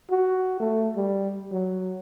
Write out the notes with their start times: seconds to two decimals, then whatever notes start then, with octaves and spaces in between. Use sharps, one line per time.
0.11 F#4
0.60 A3
0.96 G3
1.52 F#3